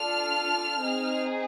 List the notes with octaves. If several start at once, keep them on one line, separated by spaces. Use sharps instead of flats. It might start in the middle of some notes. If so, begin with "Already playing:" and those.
Already playing: D4 F4 A4 F6
C4 D#4 G#4